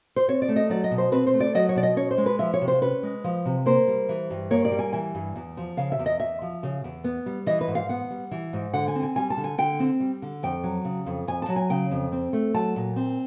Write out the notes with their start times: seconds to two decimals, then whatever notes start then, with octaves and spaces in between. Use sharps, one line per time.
0.16 C5
0.28 C4 C#5
0.42 D5
0.49 A3
0.56 D#5
0.70 F#3 D5
0.84 D#5
0.91 B2
0.98 C5
1.12 C4 B4
1.27 C5
1.34 A3
1.40 D5
1.55 F#3 D#5
1.69 C#5
1.75 B2 D5
1.83 D#5
1.97 C#4 C#5
2.11 C5
2.18 G#3
2.26 B4
2.39 F3 E5
2.54 C#5
2.61 C3
2.68 C5
2.82 C#4 B4
3.03 G#3
3.24 F3
3.45 C3
3.66 A#3 C5
3.88 G3
4.09 E3
4.30 G2
4.51 A#3 C#5
4.65 D5
4.71 G3
4.79 G#5
4.93 E3 G#5
5.15 G2
5.36 E2
5.57 F3
5.77 C#3 F5
5.92 E5
5.99 E2
6.06 D#5
6.20 E2 E5
6.42 F3
6.63 C#3
6.84 E2
7.04 B3
7.26 G3
7.46 E3 D#5
7.61 B4
7.68 G#2
7.75 F5
7.89 B3 F#5
8.11 G3
8.31 E3
8.53 G#2
8.74 D3 F#5
8.88 G#5
8.95 C4
9.03 G#5
9.16 G3 G#5
9.30 A5
9.37 D3
9.44 G#5
9.58 D3 G5
9.80 C4
10.00 G3
10.22 D3
10.43 F2 G5
10.64 F#3
10.85 C#3
11.06 F2
11.28 F2 G#5
11.42 A5
11.49 F#3
11.56 G#5
11.70 C#3 G5
11.91 F2
12.12 C4
12.33 A3
12.54 F#3 A5
12.76 A#2
12.96 C4